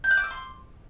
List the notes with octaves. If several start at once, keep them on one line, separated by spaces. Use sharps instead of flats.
G6
F#6
D6
E6
C6